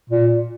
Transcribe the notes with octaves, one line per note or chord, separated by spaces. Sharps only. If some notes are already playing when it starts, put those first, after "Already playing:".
A#2